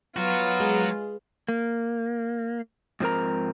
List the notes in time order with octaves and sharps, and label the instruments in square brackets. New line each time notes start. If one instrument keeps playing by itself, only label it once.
[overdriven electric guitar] F#3 F#4 [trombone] B3 [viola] F4
[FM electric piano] G#3 G#4 B4
[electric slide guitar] A#3
G#2 F3 C4 A#4 A#5